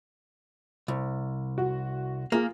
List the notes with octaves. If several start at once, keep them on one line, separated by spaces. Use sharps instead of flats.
C2
F#4
A#3 F4 G#4 A#4